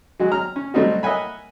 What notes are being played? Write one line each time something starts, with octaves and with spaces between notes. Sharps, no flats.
F#3 G#3 F#4
A#5 F6
C#4
F#3 G3 A3 C4 D#4 F#4
A#4 D#5 E5 F#5 G#5 B5